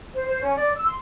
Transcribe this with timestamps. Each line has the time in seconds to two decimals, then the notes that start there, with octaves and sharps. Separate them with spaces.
0.14 C5
0.27 C5
0.41 C#4
0.56 D5
0.75 E6
0.86 C6